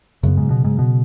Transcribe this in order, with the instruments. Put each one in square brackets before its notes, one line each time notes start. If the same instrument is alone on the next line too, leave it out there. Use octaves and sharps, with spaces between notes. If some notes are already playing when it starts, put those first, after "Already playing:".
[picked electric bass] F#2 [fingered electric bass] C#3 F#3 B3
[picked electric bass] G#2
B2
G#2
B2